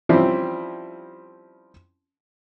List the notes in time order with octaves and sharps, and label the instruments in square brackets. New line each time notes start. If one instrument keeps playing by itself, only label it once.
[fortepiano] F3 G3 C4 C#4 E4